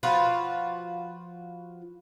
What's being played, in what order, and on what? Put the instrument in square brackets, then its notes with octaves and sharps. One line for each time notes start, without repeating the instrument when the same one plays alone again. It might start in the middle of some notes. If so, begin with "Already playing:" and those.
[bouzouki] F3 F4 F#4 B4